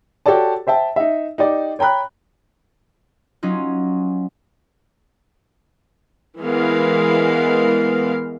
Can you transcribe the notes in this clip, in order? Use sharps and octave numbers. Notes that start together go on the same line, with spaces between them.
F#4 G4 A4 C#5 D5 A5
C5 E5 G5 A5
D#4 E5
D#4 G4 D5
C#5 G5 A#5 B5 F#6
F#3 C#4 D#4 F4
E3 G#3 B3 A#4 F5